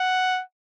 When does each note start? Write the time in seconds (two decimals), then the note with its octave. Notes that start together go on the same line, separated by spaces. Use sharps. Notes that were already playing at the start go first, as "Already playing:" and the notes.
Already playing: F#5